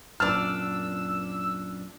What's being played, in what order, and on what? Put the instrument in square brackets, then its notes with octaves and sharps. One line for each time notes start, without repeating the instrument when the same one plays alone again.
[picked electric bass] F#2 A#2 [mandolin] D4 D5 [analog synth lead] E6 [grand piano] F6